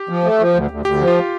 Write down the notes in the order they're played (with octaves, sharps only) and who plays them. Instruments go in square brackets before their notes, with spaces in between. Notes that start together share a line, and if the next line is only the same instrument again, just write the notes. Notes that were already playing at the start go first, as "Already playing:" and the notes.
Already playing: [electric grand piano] G4
[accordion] F3
A3
F3
D2
D2
[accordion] D2 [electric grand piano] G4
[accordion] F3
[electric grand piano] F4